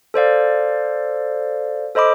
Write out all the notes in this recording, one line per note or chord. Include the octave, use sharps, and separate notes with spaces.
A4 C5 D5 F5
A4 C5 D#5 B5 D6